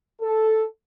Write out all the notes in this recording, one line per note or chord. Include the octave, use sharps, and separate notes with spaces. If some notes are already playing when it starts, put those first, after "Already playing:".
A4